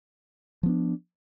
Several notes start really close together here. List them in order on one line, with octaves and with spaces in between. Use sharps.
F3 B3 D4